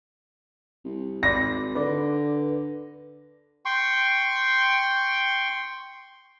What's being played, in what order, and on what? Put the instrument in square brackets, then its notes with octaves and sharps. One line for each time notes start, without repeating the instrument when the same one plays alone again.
[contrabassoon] C2
[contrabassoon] G#1 [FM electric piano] D5 B5 C6 [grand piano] A#6
[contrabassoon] D3 [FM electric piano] B4 D5
[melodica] G5 C6 C#6